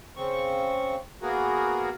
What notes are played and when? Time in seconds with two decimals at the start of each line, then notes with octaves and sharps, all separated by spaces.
0.17 C#3 C4 C#6
1.22 A#3 B3 F#4 G#4 A#4